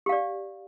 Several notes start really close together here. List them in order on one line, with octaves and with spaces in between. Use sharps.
G4 F5 D5